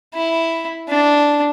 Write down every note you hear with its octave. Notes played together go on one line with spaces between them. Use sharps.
E4
D4